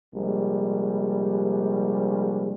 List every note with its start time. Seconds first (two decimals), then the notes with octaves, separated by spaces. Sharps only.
0.13 A#1 C3 G3 G#3